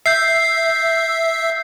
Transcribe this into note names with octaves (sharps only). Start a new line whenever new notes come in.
E5 G6 C7